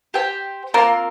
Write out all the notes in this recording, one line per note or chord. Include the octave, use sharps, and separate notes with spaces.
G4 C5 G5
A#3 C4 F4 A#4